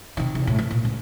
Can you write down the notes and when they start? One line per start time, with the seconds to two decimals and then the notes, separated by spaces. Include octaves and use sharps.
0.17 C3 D#3
0.35 E2
0.47 A2
0.58 E3
0.71 A#2
0.85 C#2